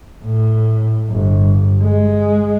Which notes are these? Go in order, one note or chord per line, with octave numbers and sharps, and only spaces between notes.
A2
G1
G#3